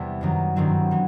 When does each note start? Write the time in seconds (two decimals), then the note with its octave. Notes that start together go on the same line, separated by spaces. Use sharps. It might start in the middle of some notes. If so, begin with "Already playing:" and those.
Already playing: E2 C3 G3 B3
0.21 F#2 D#3 F#3
0.56 G2 D#3 F#3 C4 E4
0.91 E3 B3